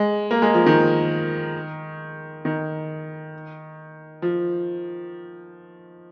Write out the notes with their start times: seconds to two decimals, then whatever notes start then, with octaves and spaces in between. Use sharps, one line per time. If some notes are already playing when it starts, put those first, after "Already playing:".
Already playing: G#3
0.31 A#3
0.42 G#3
0.54 F3
0.66 D#3
2.45 D#3
4.22 F3